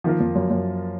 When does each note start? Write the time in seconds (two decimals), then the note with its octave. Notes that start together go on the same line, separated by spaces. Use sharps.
0.04 D#3 F3 A#3 F4 A#4
0.20 F2
0.35 F#2
0.50 F#2